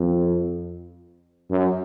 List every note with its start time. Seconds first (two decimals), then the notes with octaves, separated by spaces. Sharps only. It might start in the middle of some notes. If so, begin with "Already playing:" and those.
Already playing: F2
1.51 F#2